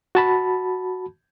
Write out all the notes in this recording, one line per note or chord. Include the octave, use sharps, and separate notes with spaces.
F#4 A5 B5